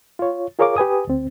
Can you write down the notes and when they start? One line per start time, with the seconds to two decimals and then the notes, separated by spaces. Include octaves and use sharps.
0.19 F4 C#5
0.59 F4 G#4 A#4 C#5 F5 D6
0.77 G4 B4 G#5 D#6
1.07 D2 C4